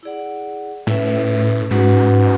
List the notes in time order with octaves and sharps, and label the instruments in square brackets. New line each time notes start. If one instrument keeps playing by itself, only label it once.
[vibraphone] E4 G#4 D5 F#5
[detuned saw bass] A2 [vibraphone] C#4 E4 B4 E5
[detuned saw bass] G#2 [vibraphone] C#4 F#4 B4 F#5